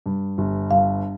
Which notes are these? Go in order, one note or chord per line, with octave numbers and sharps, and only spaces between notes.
G2
G1
G2 F5